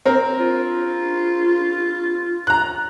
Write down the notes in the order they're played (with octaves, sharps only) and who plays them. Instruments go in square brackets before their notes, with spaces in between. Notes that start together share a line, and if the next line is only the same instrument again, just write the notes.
[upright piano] C4 A#4
[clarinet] F4
[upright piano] A#5 F#6